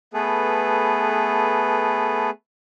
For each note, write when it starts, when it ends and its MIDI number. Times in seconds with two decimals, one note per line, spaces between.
0.14 2.30 57
0.14 2.30 59
0.14 2.30 68
0.14 2.30 69
0.14 2.30 71